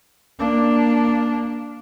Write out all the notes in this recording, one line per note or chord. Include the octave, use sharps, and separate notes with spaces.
A#3 D4